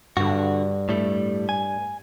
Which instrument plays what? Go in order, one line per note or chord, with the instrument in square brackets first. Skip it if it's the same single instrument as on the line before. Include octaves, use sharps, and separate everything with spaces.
[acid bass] G2 [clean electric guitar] D3 F#4
[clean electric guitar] A2 G3 A3
G#5